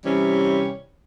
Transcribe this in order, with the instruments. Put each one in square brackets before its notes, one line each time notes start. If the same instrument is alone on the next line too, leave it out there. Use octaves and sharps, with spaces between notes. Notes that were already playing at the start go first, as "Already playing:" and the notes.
[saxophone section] C3 E3 G3 C#4